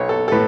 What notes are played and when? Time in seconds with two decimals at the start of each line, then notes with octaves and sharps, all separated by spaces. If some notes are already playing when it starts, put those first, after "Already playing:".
Already playing: B1 C#5
0.09 A4
0.28 A4
0.32 A2 B4